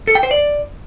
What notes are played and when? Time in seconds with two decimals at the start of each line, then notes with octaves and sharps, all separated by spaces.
0.07 A4
0.15 G5
0.23 C5
0.31 D5